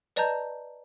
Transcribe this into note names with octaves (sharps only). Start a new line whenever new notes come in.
B4 D5 D#5 A5 A#5 G6